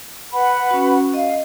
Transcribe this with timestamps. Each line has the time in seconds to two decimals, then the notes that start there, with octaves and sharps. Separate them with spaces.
0.32 B4 F#5 B5
0.71 C#4 F#4
1.14 D#5 F5